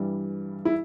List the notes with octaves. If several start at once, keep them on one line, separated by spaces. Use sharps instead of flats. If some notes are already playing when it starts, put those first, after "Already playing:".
Already playing: G2 E3 G3
E4